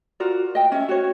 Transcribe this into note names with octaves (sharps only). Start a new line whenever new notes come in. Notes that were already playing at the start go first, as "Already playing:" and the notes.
F4 F#4 A#4 D5
D#5 G5
C#4 E5
F#4 C#5